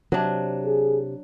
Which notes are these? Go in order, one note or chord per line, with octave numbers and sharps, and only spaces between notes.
C3 F#3 D4
G#4